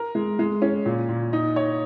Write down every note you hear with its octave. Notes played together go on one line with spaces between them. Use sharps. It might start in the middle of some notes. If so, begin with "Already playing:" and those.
Already playing: A#4
G#3
G#3
C#4
A#2
A#2
D#4
C#5